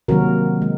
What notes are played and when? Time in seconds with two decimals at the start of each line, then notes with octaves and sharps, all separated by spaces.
0.08 C3 D#3 F#3 A#3 F#4 A#4
0.62 G#3